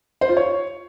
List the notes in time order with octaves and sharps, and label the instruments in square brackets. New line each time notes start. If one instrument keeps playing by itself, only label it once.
[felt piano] C5
F4
C#5